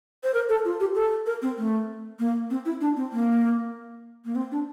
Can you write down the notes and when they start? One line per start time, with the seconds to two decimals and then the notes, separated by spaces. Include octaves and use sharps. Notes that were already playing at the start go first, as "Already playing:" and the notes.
0.24 C5
0.34 A#4
0.49 A4
0.65 F4
0.80 G4
0.95 A4
1.26 A#4
1.42 C4
1.57 A3
2.19 A#3
2.50 C4
2.65 E4
2.81 D4
2.96 C4
3.12 A#3
4.25 A#3
4.35 C4
4.52 D4